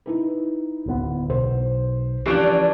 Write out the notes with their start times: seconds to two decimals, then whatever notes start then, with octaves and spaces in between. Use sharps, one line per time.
0.06 D#4 E4 B4
0.86 D1 D2 B3
1.30 B1 C5
2.26 E3 F3 D4 G4 C#6 D7